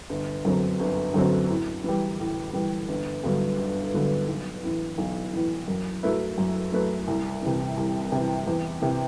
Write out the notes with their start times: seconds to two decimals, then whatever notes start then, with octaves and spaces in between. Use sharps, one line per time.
0.10 G1
0.45 F#2 D3 F#3 C4
0.80 G1
1.14 F#2 D3 F#3 C4
1.49 A2
1.84 E3 G3
2.19 A2
2.53 E3 G3
2.89 G1
3.24 G2 D3 F#3 B3
3.59 G1
3.94 G2 D3 F#3 B3
4.28 B1
4.63 A2 E3
4.98 B1
5.33 A2 E3
5.68 F#2
6.03 F#3 A3 E4 B4
6.38 F#2
6.72 F#3 A3 E4 B4
7.07 C2
7.43 C3 E3
7.77 C2
8.12 C3 E3
8.47 E2
8.82 C3 E3